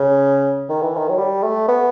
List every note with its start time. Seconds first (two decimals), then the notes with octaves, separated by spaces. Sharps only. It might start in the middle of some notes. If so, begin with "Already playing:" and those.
Already playing: C#3
0.69 D#3
0.82 E3
0.96 D#3
1.08 F#3
1.19 G3
1.43 A3
1.68 B3